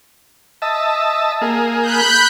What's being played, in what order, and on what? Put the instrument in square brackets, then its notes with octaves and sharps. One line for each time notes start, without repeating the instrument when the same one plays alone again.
[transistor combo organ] D#5 E5 A5
A#3 G#4
[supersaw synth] B5 F#6 G6